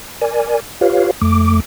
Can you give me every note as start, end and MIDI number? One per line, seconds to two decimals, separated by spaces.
0.21 0.60 70
0.21 0.60 74
0.21 0.60 80
0.81 1.11 65
0.81 1.11 67
0.81 1.11 71
0.81 1.11 73
0.81 1.11 77
1.21 1.60 41
1.21 1.60 57
1.21 1.60 86